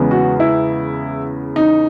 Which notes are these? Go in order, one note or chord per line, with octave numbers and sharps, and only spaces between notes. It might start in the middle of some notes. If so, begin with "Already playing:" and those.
Already playing: E2 C#3 G#3 B3
F#4
E4
D#4